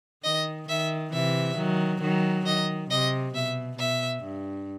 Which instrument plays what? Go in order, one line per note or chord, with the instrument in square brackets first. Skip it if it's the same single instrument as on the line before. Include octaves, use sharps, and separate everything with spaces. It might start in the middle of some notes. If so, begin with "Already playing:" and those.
[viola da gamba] D#3 [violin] D#5
[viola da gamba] D#3 [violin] E5
[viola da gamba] C3 E3 [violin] E5
[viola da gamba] D#3 F#3
D#3 F#3
[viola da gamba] D#3 [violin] D#5
[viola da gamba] C3 [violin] D#5
[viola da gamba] B2 [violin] E5
[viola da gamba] B2 [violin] E5
[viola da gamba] G2